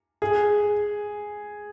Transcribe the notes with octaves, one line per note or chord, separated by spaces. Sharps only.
G#4